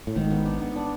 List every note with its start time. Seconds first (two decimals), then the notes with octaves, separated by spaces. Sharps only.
0.07 A2
0.16 G#1 G#2 D#3
0.30 B3
0.45 D4
0.61 B3
0.76 D4